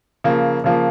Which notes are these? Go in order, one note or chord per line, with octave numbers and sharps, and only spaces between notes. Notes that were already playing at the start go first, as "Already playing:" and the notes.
C#3 F3 A#3
C#3 F3 A#3